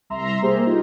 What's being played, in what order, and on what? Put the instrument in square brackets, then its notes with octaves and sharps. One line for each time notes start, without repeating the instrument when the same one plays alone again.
[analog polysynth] C2 E5 A#5 C6
A#3 G4 G#4 C5
D#4 F4 G4